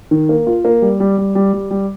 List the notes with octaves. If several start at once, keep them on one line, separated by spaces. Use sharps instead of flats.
D#3
A#3
F4
A#3
G3
G3
G3
G3
G3
G3